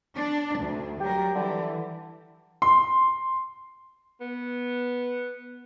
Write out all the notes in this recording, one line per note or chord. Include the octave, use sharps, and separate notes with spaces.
D4
D2
F#3 G3 G4 A#4
D3 E3
C6
B3